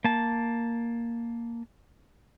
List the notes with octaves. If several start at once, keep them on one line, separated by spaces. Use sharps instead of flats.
A#3 A5